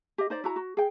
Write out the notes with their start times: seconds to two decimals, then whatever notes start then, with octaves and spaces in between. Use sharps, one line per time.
0.18 G4 D#5
0.30 D#4 C5 D5
0.44 E4 F#4 A#5
0.56 F#4
0.77 G#4 G5